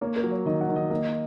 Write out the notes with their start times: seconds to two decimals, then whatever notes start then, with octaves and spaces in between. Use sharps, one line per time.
0.01 A#3 C#5
0.16 A#4
0.24 F#3
0.31 C#5
0.45 D#3 D#5
0.61 F#5
0.69 D#3
0.76 D#5
0.90 A#3 D#5